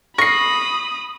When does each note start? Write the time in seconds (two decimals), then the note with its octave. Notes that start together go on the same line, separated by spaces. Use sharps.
0.18 B5 C#6 D#6 A#6 C7